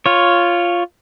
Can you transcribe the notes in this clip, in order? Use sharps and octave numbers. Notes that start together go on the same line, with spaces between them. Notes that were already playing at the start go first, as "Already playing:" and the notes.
F4 C#5